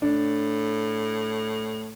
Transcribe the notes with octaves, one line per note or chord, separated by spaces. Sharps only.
A2 D4